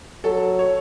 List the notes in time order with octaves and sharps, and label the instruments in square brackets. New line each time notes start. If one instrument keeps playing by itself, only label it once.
[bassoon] F#3 [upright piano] A4
[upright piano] C#5